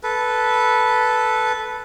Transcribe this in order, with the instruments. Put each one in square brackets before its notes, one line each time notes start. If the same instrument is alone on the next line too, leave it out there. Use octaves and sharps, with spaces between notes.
[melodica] A4 B4